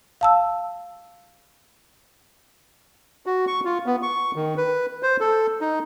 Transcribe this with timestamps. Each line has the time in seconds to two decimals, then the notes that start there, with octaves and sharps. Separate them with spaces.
0.21 F5 A5 E6
3.26 F#4
3.47 C#6
3.65 F4
3.86 B3
4.02 C#6
4.36 D#3
4.57 B4
5.03 C5
5.20 A4
5.61 D#4